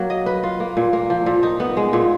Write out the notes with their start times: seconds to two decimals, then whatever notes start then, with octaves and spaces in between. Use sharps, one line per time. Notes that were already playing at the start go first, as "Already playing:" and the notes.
Already playing: F#3 A#3
0.10 D#5
0.26 B4
0.43 F4
0.60 A#3
0.77 A#2
0.93 A#3
1.10 F3
1.26 A#2
1.43 D#4
1.60 B3
1.77 G#3
1.93 A#2